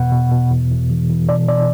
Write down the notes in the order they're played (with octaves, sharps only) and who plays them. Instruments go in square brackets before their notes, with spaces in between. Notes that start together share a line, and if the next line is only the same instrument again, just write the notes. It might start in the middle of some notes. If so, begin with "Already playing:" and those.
Already playing: [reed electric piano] E2 B2 F#5
B2
B2
E2
E2
E3
E3
B2 D5
B2 D5